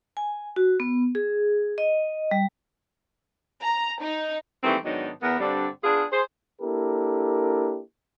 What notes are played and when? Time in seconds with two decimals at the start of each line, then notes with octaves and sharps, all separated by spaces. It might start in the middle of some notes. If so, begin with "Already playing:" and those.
0.17 G#5
0.56 F#4
0.80 B3
1.15 G#4
1.78 D#5
2.31 G3
3.62 A#5
4.02 D#4
4.64 D#3 E3 G3 A3 A#3 C4
4.84 G#2 D#3 F#3 B3 D4 D#4
5.23 E2 B3 A#4
5.40 G2 D3 G3 C4 D4
5.84 B3 D4 F4 G#4
6.12 G#4 C5
6.62 A#3 D4 E4 G4 A4 A#4